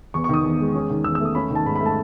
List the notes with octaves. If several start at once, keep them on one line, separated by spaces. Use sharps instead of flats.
E2 C#6
C#6
D#3 D#6
E2
G#3
C#4
D#3
E2 E6
E6
A3
D#6
C#4 B5
D#3
A5
G#2 B5
B5
A3
A5